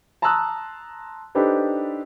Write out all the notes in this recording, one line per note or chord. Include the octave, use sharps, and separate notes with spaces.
A5 A#5 C6 D#6 E6 F#6
D4 D#4 G4 A4 B4 C5